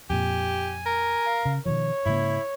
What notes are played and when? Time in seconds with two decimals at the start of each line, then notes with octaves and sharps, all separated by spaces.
0.10 F2 A#2 G4 G#5
0.86 A#4
1.26 F5
1.45 C#3
1.66 B2 D#3 F3 C#5
2.06 G#2 C#3 A#3 E4